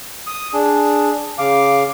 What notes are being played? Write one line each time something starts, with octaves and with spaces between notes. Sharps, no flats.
D#6
D4 G#4
C#3 F5 D6